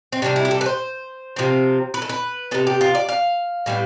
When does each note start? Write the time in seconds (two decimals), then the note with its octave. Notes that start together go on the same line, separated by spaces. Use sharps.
0.12 C4
0.22 C3 E3 G3 D4
0.36 E4
0.45 G4
0.51 A4
0.61 B4
0.66 C5
1.36 C3 F3 C4
1.94 B4
2.02 A4
2.09 B4
2.51 C3 G3 B3 A4
2.67 G4
2.81 F4
2.95 D5
3.09 F5
3.66 A2 G3 B3